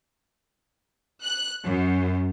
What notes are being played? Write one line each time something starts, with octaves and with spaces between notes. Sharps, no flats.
F#6
F#2